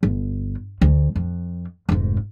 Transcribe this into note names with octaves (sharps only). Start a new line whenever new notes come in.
G1
D2
F2
F1 G#2